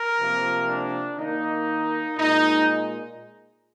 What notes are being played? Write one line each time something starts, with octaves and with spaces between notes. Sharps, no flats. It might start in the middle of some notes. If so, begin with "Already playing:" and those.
Already playing: A#4
C3 F3 A#3
D4
D#3 A#3 D#4
A#2 G#3 D#4